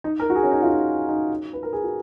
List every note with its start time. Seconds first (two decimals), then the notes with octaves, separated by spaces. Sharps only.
0.04 D#4
0.20 A#4
0.30 F#4
0.35 G#4
0.43 C#4
0.52 D#4
0.62 F4
0.68 D#4
1.08 D#4
1.53 B4
1.63 A#4
1.73 G#4
1.84 F#4